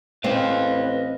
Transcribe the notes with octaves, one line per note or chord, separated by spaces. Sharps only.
A1 C4 B4 D#5 F5